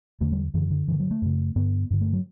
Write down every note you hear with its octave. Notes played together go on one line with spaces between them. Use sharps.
E2 D3 A3
G3
F#2 D3 E3
D3
G2 D3 E3
F#3
A3
F#2 C#3
G2 D3 B3
G2 D3
A3
F#3